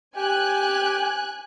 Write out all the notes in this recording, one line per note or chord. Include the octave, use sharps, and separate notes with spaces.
G4 G#5 F#6